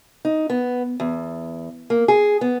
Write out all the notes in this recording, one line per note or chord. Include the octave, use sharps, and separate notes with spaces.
D#4
B3
E2
A#3
G#4
B3